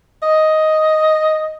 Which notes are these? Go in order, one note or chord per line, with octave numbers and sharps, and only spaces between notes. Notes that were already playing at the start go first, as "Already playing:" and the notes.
D#5